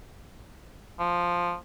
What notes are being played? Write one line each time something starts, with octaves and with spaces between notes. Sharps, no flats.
F3